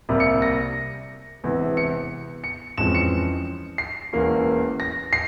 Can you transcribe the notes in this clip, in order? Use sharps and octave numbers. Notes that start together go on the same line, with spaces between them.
C2 C3 G3 A#3
C#7
A#6
E1 E2 C3 E3
C#7
C#7
F2 E3 G#3 C#4 E7
C#7
C7
E1 E2 E3 A#3 C#4
A#6
C7